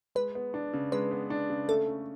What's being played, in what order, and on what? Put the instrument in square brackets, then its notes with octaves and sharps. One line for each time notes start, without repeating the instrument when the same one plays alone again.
[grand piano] G#3 [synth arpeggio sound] B4
[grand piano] B3
D4
C#3
[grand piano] G#3 [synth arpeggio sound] B4
[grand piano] B3
D4
C#3
[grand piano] A3 [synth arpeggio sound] A4
[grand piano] C#4